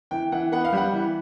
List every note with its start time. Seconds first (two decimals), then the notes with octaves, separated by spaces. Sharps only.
0.11 E3 G5
0.32 E3 F#5
0.52 B3 F#5
0.64 F5
0.73 G3 F#5
0.93 E3